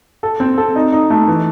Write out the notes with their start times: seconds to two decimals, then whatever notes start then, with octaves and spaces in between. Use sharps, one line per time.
0.23 A4
0.40 C4
0.58 A4
0.75 D#4
0.92 D#4
1.10 A3
1.28 E3